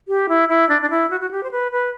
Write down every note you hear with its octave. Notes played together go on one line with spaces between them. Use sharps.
G4
E4
E4
D4
D4
E4
F#4
F#4
G4
C5
B4
B4